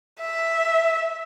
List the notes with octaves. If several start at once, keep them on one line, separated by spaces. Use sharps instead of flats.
E5